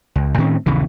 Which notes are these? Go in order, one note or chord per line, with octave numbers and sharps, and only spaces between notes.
C#2
A2 D#3 C4 C#4
A#1 E2 C#3 E3